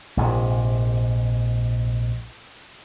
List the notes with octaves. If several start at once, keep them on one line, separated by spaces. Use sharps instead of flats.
A#1 G#2 C3